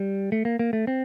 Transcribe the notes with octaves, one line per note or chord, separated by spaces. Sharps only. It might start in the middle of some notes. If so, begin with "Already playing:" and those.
Already playing: G3
A3
A#3
A#3
A3
C4